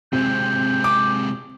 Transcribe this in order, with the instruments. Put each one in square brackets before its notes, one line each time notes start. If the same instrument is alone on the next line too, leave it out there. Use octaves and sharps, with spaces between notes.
[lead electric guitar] C3 G#3 [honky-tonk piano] C4 [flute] G6
[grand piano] D6